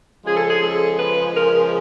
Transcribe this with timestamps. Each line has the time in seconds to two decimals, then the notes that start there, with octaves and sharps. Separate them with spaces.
0.25 C#3 F3 G#3 G#4
0.36 A4
0.48 G#4
0.61 A4
0.98 B4
1.35 A#4